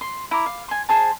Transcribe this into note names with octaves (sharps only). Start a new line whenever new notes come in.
C6
E4 A#5 D6
F5
G#5 C6
G#4 C5 A5